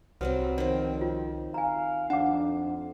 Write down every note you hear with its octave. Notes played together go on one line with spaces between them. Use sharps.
C2 F#3 G3 C4 B4
C#2 D#3 F3 C4 C#5
F4
F5 G#5 A#5
F2 D4 F#5 D6